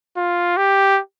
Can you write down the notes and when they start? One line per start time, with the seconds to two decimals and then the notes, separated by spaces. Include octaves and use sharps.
0.17 F4
0.57 G4